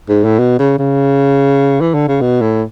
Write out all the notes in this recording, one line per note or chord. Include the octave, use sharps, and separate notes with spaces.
G#2
A2
B2
C#3
C#3
E3
D3
C#3
B2
A2